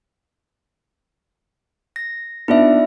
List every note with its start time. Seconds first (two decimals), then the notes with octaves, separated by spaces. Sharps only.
1.96 A#6
2.48 B3 D4 D#4 F4 E5